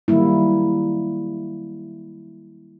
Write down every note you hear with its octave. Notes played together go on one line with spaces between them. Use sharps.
D#3 F#3 G3 A#3 E4